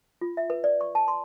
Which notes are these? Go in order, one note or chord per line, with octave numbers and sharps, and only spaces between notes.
F4
E5
B4
D5
C#6
A5
C6